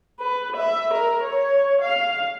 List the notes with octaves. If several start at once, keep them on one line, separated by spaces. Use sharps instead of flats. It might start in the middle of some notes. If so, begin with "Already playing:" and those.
B4
E5
A#4
C#5
F5